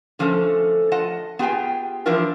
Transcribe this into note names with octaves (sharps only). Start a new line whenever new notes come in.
D3 F3 A3 C#4 A4
F4 D#5 F#5 A5
B3 F4 G4 G#4 G5 G#5
E3 F3 D4 E4 F4 A#4